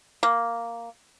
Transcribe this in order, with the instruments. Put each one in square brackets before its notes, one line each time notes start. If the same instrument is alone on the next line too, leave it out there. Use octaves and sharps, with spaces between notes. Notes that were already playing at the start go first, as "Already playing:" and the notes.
[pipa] A#3